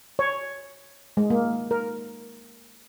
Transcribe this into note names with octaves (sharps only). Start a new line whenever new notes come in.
C#5
G#3
A#3
A#4